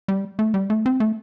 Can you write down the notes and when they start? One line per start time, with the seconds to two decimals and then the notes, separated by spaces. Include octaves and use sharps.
0.08 G3
0.39 A3
0.54 G3
0.70 A3
0.86 C4
1.00 A3